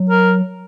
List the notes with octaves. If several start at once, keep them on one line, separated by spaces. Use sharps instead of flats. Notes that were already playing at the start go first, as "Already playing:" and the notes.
Already playing: F#3
A#4